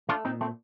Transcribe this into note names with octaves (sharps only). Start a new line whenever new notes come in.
A3 D4 F4
A#2 C4 D#4
A3 C4